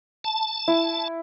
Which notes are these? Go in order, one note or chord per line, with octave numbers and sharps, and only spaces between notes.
A5
E4